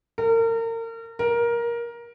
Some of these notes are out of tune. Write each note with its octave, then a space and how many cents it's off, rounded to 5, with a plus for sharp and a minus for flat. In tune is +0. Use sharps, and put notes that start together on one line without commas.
A#4 -35
A#4 +15